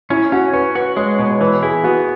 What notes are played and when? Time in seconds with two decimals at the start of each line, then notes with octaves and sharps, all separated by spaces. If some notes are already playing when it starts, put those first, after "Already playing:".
0.10 C#4 E4
0.32 C#4 F#4
0.53 C#4 B4
0.75 F#4 B4
0.97 G#3 C#5
1.18 B2 C#5
1.41 E3 B4
1.63 E4 G#4
1.84 B3 F#4